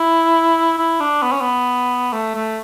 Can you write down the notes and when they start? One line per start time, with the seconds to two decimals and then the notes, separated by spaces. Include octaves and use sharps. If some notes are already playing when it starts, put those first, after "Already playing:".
Already playing: E4
0.78 E4
1.00 D4
1.22 B3
1.32 C#4
1.41 B3
2.13 A3
2.35 A3